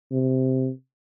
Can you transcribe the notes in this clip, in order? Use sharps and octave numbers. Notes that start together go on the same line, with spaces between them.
C3